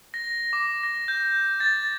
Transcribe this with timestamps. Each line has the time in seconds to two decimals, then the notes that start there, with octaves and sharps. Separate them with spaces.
0.14 A#6
0.53 D6
0.83 A#6
1.08 G6
1.60 A6